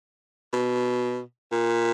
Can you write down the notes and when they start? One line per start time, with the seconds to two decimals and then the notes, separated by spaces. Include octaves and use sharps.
0.53 B2
1.52 A#2